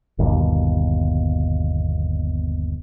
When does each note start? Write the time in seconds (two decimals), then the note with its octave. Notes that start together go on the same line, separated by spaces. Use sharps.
0.19 G1 D#2 B2